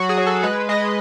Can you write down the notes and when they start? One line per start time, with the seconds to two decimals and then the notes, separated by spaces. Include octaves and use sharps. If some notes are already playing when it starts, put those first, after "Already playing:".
Already playing: F#3 F#4
0.09 G#4
0.17 F#3
0.26 A4
0.43 G#3 B4
0.69 G#3 D#5